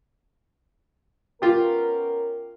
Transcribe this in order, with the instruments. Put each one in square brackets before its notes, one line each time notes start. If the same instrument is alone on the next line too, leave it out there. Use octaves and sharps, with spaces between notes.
[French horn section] B3 C#4 A#4 [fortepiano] F4 G4